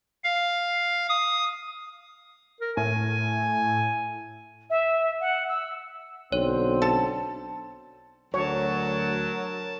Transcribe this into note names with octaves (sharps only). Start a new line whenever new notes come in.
F5
D#6
A#4
A2 G#5
E5
F#5
E6
B1 D3 C4 C#5
A4 A5
D2 F#3 A#4 C#5 A5